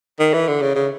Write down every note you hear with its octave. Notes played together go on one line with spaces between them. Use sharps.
D#3
E3
D3
C#3
C#3